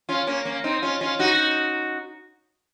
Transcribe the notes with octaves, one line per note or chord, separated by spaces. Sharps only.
C#4 F4
A#3 C#4
A#3 C#4
C4 D#4
C#4 F4
C#4 F4
D#4 F#4